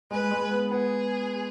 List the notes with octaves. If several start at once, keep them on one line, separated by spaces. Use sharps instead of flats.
G#3 B4
G#3
B3
B3 G#4